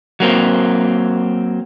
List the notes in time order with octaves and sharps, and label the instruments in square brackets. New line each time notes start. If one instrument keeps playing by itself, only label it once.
[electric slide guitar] F#3 A#3 C4